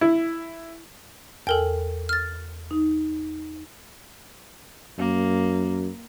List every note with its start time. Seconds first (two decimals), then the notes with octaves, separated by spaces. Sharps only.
0.01 E4
1.47 E2 A4 A#4 G5
2.09 F6 A6
2.71 D#4
4.98 F#2 A#3